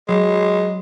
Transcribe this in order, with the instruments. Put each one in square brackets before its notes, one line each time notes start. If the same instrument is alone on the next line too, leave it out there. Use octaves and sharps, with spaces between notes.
[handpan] F#3 [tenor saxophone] G#3